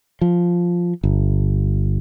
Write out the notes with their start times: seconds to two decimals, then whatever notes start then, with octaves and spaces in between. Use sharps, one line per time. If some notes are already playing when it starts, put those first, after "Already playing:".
0.21 F3
1.04 G1